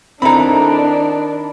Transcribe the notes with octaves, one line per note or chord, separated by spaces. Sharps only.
D#3 C4 D4 E4 A4 A#5 B5